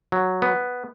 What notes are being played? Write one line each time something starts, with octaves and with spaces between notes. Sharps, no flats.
F#3
B3